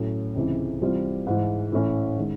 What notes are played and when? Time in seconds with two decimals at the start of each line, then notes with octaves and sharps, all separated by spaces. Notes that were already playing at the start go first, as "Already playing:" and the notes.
Already playing: A2 F#3 A3 C#4
0.35 C#2 C3 E3
0.81 C3 E3 G3 C4 F4
1.27 G#2 E3 G#3
1.72 A2 E3 A3 C#4 E4
2.17 D#3 G#3